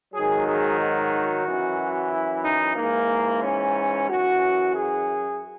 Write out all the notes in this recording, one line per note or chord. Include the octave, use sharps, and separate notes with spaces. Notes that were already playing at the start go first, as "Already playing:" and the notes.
G#2 D#3 F#3 G#4
G#4
F#4
F#2 E3
E4
D#4
G#2 E3 A#3
C#4
F#2 E3 F#4
G#4